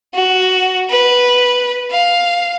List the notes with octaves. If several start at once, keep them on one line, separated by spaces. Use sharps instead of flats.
F#4
B4
F5